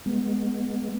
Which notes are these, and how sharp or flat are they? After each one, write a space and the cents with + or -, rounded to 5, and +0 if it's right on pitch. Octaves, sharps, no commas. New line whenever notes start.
G#3 +0 B3 -10